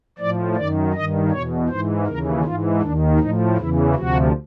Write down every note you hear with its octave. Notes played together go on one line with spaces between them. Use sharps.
A2 F3 D5
F#2 D#3 D5
G2 D#3 D#5
E2 B2 C#5
G#2 E3 C5
D#2 C#3 E3 A#4
G#2 E3 F4
D#2 D#3 D4
A2 F3 D#4
E2 C#3 E3 E4
D2 C3 F3 F#4